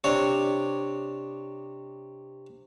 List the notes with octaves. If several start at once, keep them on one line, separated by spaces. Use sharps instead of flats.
C3 D4 C#5